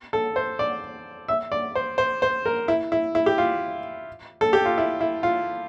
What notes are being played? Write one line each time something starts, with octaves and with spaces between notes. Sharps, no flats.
A4
C5
D5
E5
D5
C5
C5
C5
A#4
E4
E4
E4
G4
F4
A4
G4
F4
E4
E4
F4